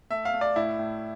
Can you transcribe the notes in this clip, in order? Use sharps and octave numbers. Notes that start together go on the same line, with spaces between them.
A3 E5
F5
A3
D5
A2 E4
A2